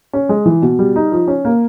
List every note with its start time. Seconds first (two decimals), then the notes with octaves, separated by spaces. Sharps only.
0.13 C#4
0.29 G#3
0.46 E3
0.62 B2
0.79 G3
0.96 D#4
1.12 F3
1.28 C#4
1.45 A#3